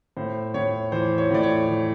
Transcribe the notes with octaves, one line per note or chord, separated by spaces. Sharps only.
A2 C5
A2 C#5
E3 C5
C#5
A2 D5
C#5
E3